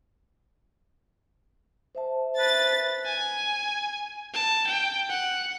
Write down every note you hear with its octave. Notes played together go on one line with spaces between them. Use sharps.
C5 E5 A5
B4 A6
G#5
A5
G5
F#5